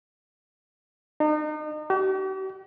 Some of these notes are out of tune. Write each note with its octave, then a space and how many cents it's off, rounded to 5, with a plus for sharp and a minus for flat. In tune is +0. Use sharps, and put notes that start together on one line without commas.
D#4 -35
G4 -45